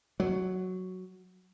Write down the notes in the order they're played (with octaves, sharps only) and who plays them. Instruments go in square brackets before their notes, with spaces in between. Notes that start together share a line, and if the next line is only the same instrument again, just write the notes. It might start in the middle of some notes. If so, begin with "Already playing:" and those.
[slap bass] F#3